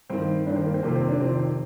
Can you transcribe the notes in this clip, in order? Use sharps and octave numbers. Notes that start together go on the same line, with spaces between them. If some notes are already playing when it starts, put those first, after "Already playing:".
G2 D#3 C4
G2 D#3 D4
C4
A#3
C4
F2 C3 D#3 A#3
C4
D4
F2 C3 D#3 C4
C4